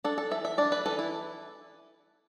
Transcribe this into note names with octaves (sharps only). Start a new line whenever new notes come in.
D4 A4
A4
E3 E5
E5
D4 D5
B4
E3 A4
E4